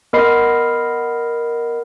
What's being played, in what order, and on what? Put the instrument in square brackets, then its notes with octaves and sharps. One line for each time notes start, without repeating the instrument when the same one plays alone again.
[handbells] B3 A#4 D#5 B5 C7